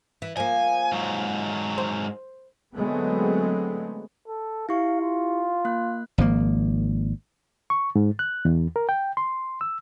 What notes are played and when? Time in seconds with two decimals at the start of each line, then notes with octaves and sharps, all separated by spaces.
0.22 E3
0.37 F3 A#3 G#5
0.92 G#2 F#3
1.78 C5
2.75 D3 F#3 G#3 A3 B3 C4
4.28 A4
4.69 E4 G4 F5 C#6
5.01 F4
5.65 A#3 F#6
6.18 G#1 F3 A#3
7.70 C#6
7.96 G#2
8.19 F#6
8.45 E2
8.76 A#4
8.89 G5
9.17 C6
9.61 E6